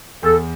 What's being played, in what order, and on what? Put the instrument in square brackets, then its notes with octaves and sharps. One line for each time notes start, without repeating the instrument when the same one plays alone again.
[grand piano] E2 [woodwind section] A4